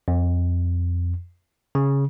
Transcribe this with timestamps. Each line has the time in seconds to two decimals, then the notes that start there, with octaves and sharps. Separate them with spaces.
0.08 F2
1.75 C#3